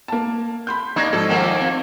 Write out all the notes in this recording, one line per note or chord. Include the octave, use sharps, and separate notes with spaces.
A#3 A5
B5 C6 G6
A#3 D4 D#4 C#6 G#6 A#6
G#2 F3 A4
D#3 F3 A#3 A#4 F#5 G#5
C4